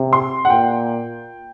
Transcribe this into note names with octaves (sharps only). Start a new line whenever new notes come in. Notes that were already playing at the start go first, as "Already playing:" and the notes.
Already playing: C3
C6
F#5
A#2 G5